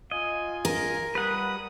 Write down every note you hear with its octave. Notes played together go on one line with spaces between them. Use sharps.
F4 D#5 G#5
A#4
G3 B4 F#5 D#6